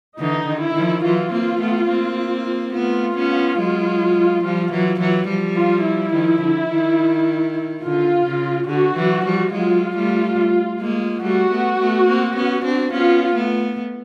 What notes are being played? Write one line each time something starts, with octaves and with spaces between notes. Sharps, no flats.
D3 E3 D#4
D#3
E4
D#3 F3
E3 F#3 F4
A#3 C4
A3 B3
A#3 C4
A3 B3 F4
B3 C#4
F#3 G#3
F3 G3
E3 F#3
E3 F#3
F3 G3
F4
E4
D#3 F3
D3
D#3
D3 F4
C#3
D3 F#4
E3 F#3
F3 G3
F#3 G#3 F4
G3 A3
G#3 A#3
G3 A3 F#4
A3 B3
A3 B3
A#3 C4
B3 C#4
C4 D4
B3 C#4 F4
A3 B3